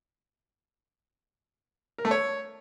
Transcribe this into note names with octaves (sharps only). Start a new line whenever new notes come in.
A#4
A3
C#5